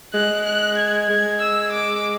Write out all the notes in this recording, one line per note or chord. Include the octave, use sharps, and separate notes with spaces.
G#3 F#6
F#6
G#6
G#3 G#6
E6
D6